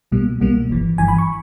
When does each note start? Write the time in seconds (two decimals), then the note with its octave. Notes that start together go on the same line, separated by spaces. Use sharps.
0.12 B1 B2 G3 A#3
0.40 B1 B2 G3 A#3
0.70 G1 G2 E3
0.98 G1 G2 E3 G#5
1.08 B5
1.18 C#6